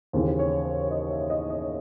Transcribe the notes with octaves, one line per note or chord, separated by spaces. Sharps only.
D#2 C#3 E3 C5
C#5
C5
D#5
E5
D#5
D#5